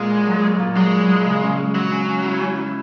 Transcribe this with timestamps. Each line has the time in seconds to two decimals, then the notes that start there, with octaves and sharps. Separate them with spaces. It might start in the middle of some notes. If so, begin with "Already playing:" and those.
Already playing: A#2 G#3
0.10 E4
0.27 F#3
0.43 A#2
0.59 A#2
0.76 F#3 G#3
0.93 E4
1.09 F#3
1.26 C#3
1.42 C#4
1.59 G#3
1.75 F#3 G#3
1.92 C#4
2.09 C#4
2.26 E4
2.42 C#4
2.58 E4